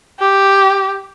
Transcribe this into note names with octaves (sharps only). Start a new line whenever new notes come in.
G4